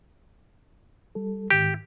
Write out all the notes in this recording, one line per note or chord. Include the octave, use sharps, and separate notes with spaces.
G3 A4
G#2 D#3 G4 G6